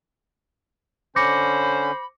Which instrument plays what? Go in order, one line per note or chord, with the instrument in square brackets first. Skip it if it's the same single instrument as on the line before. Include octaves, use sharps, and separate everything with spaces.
[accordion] D3 C#4 [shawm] C5 [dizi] B5 [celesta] D6 A#6 C#7